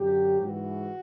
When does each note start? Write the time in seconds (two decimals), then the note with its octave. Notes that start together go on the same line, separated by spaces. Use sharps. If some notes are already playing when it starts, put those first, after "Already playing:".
Already playing: F#2 D3 F#3 G4
0.40 G#2 E3 F#4